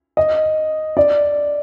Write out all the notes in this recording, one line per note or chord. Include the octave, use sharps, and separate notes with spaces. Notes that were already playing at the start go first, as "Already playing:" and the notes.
D#5
D5